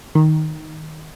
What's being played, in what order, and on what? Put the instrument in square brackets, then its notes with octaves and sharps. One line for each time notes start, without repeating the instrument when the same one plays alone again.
[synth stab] D#3